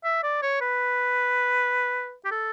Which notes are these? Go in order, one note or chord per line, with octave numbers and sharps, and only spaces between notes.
E5
D5
C#5
B4
G4
A4